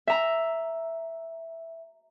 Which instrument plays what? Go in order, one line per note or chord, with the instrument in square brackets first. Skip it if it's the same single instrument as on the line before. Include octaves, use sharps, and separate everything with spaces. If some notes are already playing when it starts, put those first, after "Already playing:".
[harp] E5 A#5